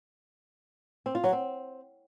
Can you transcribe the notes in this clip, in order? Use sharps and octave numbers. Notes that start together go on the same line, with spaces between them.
C4
F4
F#3
C4